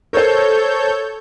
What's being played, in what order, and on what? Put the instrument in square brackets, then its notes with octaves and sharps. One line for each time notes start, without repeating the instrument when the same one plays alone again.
[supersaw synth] A4 C#5 G6 [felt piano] A#4 C5